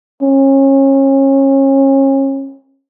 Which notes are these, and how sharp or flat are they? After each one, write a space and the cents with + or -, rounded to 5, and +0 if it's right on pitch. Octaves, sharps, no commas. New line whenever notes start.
C#4 -30